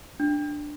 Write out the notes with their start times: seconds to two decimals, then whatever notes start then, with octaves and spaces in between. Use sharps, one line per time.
0.20 D4